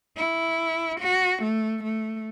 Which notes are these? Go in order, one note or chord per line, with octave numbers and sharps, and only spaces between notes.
E4
F#4
A3
A3